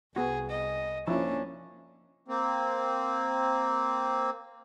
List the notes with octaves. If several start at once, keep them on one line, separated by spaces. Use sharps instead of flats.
C2 B3 F#4 G#4
D#5
F3 A#3 C#4 D4 E4
A#3 C4